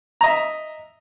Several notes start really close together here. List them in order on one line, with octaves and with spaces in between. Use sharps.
A#5 D#5 E5